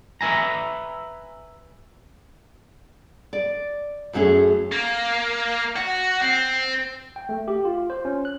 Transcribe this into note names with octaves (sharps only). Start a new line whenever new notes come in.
B4 E5 G#5 A#5
D5
F#2 F#3 A3 C#4 G#4
A#3
F#4
C4
G5
A3
G4
F4
C5
C#4
F#6